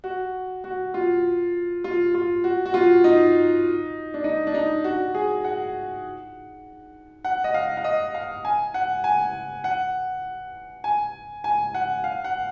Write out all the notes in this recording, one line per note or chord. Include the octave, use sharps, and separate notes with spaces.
F#4
F#4
F4
F4
F4
F#4
F#4
F4
D#4
D4
D#4
D4
D#4
F#4
G#4
F#5
F#5
D#5
F5
F5
D#5
F5
G#5
F#5
G#5
F#5
G#5
G#5
F#5
F5
F#5